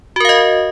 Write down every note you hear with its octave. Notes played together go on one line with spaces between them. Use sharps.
F#4 A#4 D#5 F5